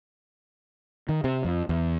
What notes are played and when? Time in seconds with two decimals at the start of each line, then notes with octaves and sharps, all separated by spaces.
1.09 D#3
1.24 C3
1.44 F2
1.69 E2